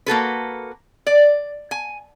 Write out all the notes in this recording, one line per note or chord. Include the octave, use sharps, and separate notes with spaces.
A#3 F#4 A4 B4
D5
G#5